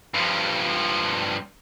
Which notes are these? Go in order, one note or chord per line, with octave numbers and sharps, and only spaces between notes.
G2 F3